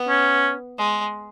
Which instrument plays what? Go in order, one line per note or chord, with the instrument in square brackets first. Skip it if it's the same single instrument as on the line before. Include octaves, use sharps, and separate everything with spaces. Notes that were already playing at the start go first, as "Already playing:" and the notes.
Already playing: [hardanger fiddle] B3
[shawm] C#4
[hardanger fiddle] G#3